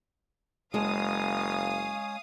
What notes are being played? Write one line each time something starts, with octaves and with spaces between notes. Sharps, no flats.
F#1 G#3 C#4 G#4 C#5 F5 A5 D#6